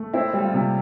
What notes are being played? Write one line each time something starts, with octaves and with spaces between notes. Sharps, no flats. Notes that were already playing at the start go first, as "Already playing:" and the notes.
Already playing: A3
C4 E4
G3
F4
C3